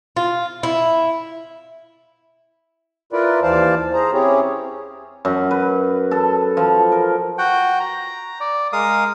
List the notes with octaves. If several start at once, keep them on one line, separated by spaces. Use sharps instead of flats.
F4
E4
E4 F4 A#4 B4 D5
D#2 E3 C5 D5 F5 A5
G#4 C5 A#5
C4 C#4 E4 G4 G#4 C#5
F#2
B4
A4
F3
A#4
F#4 F#5 G5
A#5
D5
G#3 A#4 F5 D#6